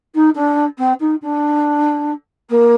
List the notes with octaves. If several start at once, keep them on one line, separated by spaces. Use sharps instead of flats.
D#4
D4
C4
D#4
D4
A#3